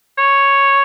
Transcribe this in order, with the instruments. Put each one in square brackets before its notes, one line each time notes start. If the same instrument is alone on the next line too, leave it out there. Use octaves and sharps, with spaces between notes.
[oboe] C#5